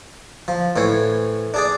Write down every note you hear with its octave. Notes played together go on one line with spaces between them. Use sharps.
F3
A2 E3 C5 C#5
D4 G#4 D5